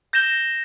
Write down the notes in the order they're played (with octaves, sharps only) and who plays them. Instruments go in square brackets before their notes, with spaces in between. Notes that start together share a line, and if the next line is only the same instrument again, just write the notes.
[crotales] G6 A#6 E7 G7